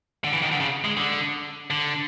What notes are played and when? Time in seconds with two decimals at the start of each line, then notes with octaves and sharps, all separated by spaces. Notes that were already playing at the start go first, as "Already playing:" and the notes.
0.24 D3
0.33 E3
0.42 D#3
0.51 D3
0.60 C#3
0.84 G#3
0.97 D3
1.70 D3